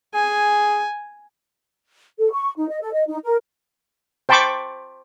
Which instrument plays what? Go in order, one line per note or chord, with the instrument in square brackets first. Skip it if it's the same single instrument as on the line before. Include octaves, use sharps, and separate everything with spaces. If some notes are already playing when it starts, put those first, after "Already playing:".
[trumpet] G#4 [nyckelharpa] G#5
[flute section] A4
C#6
D#4
D#5
A4
D#5
D#4
A#4
[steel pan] C5 G5 A5 B5 C#6 D6